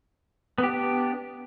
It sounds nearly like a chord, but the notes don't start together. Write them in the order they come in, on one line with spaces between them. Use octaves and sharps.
B3 G4 D4